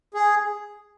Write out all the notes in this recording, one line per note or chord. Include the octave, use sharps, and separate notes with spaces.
G#4